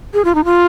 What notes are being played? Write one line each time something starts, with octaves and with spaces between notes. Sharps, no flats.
G#4
F4
D#4
F4